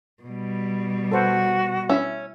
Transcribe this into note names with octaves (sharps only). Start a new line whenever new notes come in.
B2 G3
F#4 A4 B4 C5
C#4 E4 E5 E6